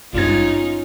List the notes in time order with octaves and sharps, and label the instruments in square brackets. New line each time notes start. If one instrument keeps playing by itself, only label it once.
[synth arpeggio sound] G#1 G2 G#6 [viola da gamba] C#4 D#4 F4